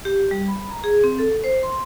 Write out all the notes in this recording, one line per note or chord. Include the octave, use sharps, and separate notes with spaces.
G4
G3
B5
A#5
G#4
C4
A4
C5
C6